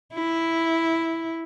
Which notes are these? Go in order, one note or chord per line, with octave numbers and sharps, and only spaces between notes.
E4